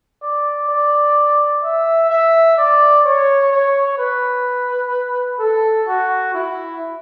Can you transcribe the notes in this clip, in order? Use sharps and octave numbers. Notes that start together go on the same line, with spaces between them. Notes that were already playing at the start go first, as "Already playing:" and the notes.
D5
D5
E5
E5
D5
C#5
C#5
B4
A4
F#4
E4